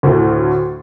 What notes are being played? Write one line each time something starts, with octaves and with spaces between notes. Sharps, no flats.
D2 A2